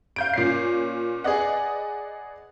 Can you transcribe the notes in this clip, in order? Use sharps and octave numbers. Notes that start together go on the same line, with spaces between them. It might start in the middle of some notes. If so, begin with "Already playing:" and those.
F5 G6 D7
A#2 C#4 C7
G#4 B4 D5 D#5 F#5